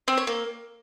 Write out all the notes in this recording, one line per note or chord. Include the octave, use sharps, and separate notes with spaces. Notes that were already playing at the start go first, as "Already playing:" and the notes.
C4
C#5
A#3